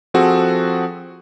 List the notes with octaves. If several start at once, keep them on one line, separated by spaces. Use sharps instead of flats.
F3 C4 F#4 G#4 A4